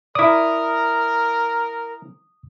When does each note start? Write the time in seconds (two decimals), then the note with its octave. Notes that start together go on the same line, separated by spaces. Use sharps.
0.15 E4 A#4 D5 D#6